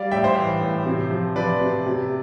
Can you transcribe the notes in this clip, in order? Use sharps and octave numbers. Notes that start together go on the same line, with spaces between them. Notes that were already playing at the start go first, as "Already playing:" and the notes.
Already playing: G3 D5 F5
A2 E5 G5
C5 E5
E3
A2
C3
F3
F3 B4 D5
C3
C3